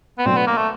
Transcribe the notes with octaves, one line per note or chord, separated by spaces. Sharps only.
B3
B2 F#3 A3 C4 D4
B3
A#3
A3